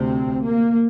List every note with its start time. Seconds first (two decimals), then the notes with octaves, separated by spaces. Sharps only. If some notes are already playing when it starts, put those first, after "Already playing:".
Already playing: D2 C3 C4
0.45 A#3